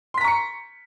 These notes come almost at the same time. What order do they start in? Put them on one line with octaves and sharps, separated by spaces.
C6 B6 A#5 C#6 C#7